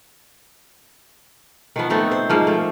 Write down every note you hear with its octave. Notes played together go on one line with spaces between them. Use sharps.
D#3 F3 B3
A3 B3 C4 D#4
C5
G#2 F3 A#3
A3